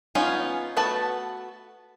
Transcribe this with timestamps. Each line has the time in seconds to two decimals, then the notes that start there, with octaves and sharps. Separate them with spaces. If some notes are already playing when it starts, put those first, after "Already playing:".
0.15 B3 C#4 D#4 F4 G#5
0.77 A3 B3 F#4 B4 A5